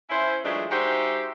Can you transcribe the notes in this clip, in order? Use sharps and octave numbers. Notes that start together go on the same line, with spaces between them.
C#4 E4 C5
E3 F#3 G#3 A3 D4 F4
G#3 D#4 F#4 G4 C5 E5